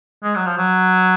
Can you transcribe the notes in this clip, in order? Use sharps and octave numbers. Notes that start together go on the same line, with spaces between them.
G#3
F#3
F3
F#3